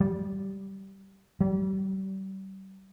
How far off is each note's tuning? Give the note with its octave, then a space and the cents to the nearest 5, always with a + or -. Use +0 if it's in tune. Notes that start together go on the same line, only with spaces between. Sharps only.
G3 -15
G3 -35